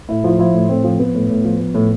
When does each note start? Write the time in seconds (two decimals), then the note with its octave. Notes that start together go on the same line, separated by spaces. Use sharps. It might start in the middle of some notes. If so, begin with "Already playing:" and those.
0.09 A2 E4
0.24 F3 F4
0.39 F3 E4
0.54 A2
0.69 A2 C4
0.84 F3
0.99 F3 B3
1.14 A2
1.29 A2
1.45 F3
1.59 F3
1.74 A2